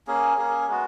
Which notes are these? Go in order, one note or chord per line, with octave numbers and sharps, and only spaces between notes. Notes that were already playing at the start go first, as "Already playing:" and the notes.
A#3 C#4 G#4
A#3 C#4 G#4
G#3 B3 F#4